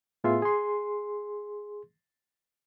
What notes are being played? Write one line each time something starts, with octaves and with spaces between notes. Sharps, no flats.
A2 B3 F4 G#4 E5 C6
G#4 C6